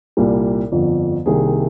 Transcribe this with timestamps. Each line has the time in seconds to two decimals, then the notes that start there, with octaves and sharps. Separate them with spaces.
0.17 C2 A#2 G3 A#3
0.72 G1 F2 D3 F3
1.25 C2 C3 D#3 A#3 G#4